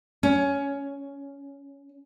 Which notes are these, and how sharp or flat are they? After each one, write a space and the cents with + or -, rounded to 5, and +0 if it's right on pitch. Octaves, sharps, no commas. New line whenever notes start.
C#4 +10